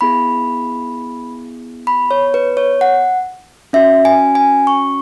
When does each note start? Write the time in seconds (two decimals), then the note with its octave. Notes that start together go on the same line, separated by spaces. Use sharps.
0.01 B3 E4 G#4 B5
1.87 B5
2.11 C#5
2.34 B4
2.57 C#5
2.81 F#5
3.73 C#4 F#4 E5
4.05 G#5
4.35 G#5
4.67 C#6